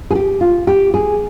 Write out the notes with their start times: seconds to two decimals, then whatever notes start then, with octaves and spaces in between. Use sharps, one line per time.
0.11 G#4
0.15 G4
0.41 F4
0.67 G4
0.94 G#4